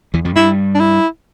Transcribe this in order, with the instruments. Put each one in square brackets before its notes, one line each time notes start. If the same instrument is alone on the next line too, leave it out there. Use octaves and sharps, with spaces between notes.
[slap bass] E2 E3
F2 F3
[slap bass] G2 G3 [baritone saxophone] E4
[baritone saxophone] D4
E4